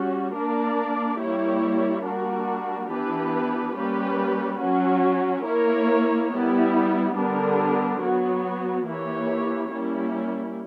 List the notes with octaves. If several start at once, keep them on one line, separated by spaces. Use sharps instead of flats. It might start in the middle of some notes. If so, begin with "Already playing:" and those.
Already playing: G3 C#4 F#4
A#3 D4 A#4 D5
G3 A#3 E4 G4 C#5
G3 A#3 D4 F#4 A#4
E3 B3 D4 G4 B4
G3 A#3 C#4 G4 B4
F#3 C#4 F#4
A#3 E4 A#4 C#5
G3 B3 E4
D3 G3 B3 D4 A#4
F#3 B3 F#4
E3 A#3 E4 G4 C#5
G3 A#3 C#4 E4